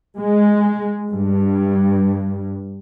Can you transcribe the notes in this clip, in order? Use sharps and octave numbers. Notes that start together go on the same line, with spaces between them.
G#3
G2